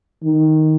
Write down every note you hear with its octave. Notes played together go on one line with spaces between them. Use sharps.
D#3